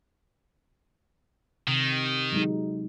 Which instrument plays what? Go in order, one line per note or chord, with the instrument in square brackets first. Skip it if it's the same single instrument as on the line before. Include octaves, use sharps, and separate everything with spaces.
[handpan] C3 [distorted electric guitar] D#3
[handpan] F#3 G#3 D#4